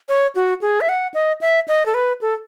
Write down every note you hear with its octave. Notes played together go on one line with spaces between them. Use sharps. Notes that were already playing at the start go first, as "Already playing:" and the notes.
C#5
F#4
G#4
E5
F#5
D#5
E5
D#5
A4
B4
A4